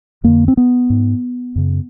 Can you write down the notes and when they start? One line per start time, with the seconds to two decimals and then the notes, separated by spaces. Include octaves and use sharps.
0.24 F2 D3 A#3
0.48 C4
0.57 B3
0.90 G#2
1.56 F#2 C#3